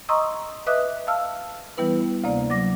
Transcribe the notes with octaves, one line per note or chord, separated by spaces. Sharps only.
D#5 A#5 C6 C#6 D#6 E6
B4 D#5 E5 D6 D#6 F#6
F5 A5 E6 F6
E3 G3 B3 E4 B4
D2 C3 A#3 D5
F#3 D6 A#6